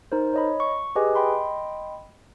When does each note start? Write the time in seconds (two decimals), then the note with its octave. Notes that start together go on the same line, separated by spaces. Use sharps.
0.12 D#4 A#4 C5
0.34 C#5 D#5 B5
0.60 C#6
0.96 G4 G#4 B4 D#5 G#5
1.15 D#5 G5 B5 C6